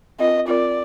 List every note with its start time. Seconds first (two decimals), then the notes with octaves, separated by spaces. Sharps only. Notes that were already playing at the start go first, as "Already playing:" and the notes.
0.19 C4 F4 A#4 D#5
0.48 C4 F4 A#4 D5